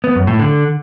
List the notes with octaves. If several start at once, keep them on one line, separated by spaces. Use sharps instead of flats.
B3
F#2
A2
D3